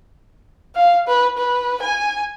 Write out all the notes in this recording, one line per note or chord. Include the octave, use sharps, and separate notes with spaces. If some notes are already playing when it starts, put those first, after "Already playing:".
F5
B4
B4
G#5